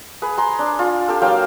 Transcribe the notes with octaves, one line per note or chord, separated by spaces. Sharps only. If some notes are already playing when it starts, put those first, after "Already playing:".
G#4 B4
G#4 A#5 C6
D4
F4
G4 A4
F#3 A#3 F5 G5